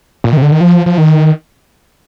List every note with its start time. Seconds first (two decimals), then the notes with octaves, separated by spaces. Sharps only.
0.24 A#2
0.33 D#3
0.37 C3
0.42 D3
0.52 D#3
0.61 F3
0.86 F3
0.98 D#3